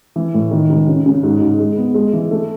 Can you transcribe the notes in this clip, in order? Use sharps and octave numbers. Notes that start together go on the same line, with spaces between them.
E3
A2
D#3
C#2
C#3
C#3
G#2
G#2
G#3
B3
G#3
E3
A3